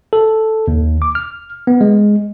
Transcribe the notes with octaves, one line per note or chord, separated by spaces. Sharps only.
A4
D#2
D6
F6
B3
G#3